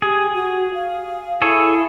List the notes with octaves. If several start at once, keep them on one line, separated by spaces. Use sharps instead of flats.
G4 G#4
F#4
F5
E4 G#4 A4 C#5